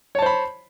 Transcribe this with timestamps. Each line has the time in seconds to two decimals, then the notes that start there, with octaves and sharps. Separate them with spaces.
0.15 C#5
0.19 A5
0.22 C5
0.26 B5